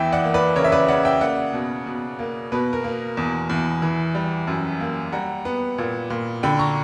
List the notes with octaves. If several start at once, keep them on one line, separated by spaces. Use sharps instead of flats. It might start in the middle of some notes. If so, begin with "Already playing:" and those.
Already playing: E2 E3 E5 G5
D5 F#5
A#3
B4 D5
C#3 A#4 C#5
E5
B4 D5
C#3 D5 F#5
E5 G5
A#3 D5 F#5
B2
B2
A#3
B2 B4
A#4
A#3
E2
E2
E3
G3
F#2
A#3
G3 F#5 A#5
B3
A#2
A#2
D3 G5 B5
A#5 C#6